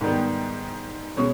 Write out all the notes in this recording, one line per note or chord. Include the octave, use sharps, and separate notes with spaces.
G#2 D#3 G3 B3
B2 G#3 C#4